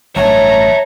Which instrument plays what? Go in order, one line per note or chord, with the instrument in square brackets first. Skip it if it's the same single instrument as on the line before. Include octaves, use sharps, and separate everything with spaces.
[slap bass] A1 G2 F#3 [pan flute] C#5 [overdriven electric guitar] E5 A5 [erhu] A#5